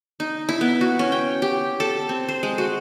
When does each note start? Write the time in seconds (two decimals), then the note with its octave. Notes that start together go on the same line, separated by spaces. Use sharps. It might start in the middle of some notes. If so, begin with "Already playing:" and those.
0.20 D#4
0.49 E4
0.61 B3
0.81 F#4
0.99 C#4
1.12 G5
1.42 G4
1.80 A4
2.09 C4
2.28 C5
2.43 G#3
2.58 F#4